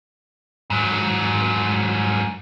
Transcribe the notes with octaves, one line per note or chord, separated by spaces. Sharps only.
G#2 F#3